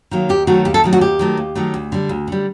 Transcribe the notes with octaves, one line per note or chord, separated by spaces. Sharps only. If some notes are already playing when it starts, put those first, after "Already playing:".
D#3 F#3 A#3
D#2 G4
D#3 F#3 A3 F#4
D#2 G4
A4
D#3 F#3 A3
F#4
D#2 G4
D#3 F#3 A3
D#2
D#3 F#3 A3
D2
D3 G3
D2
D3 G3